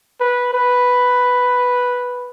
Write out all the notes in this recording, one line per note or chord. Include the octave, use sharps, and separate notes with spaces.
B4
B4